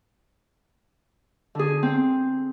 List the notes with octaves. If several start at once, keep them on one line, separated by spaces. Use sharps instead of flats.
D3 G#4
C4